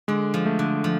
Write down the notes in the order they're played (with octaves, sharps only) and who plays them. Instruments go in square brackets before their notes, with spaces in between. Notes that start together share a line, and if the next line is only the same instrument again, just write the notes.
[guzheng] D3 [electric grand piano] G#3
[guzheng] F3
[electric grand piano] A3
[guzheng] D3
F3